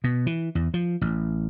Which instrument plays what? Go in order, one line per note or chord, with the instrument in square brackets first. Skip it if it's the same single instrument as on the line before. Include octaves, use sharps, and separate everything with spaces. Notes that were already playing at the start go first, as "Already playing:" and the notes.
[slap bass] B2
E3
E2
F3
A1